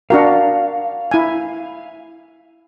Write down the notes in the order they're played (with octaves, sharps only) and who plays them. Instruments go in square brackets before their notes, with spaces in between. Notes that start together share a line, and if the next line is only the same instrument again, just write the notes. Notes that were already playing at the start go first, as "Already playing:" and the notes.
[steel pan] D4 F#4 A#4 [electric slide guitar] F5
[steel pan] E4 G#5